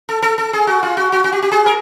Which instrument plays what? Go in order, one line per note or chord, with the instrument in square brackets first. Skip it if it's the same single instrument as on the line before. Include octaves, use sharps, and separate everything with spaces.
[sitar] A4
A4
A4
G#4
F#4
F4
F#4
F#4
F#4
G4
G4
G#4
A#4